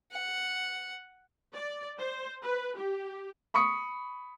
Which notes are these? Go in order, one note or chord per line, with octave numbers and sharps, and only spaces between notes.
F#5
D5
C5
B4
G4
B5 C#6 D#6 C#7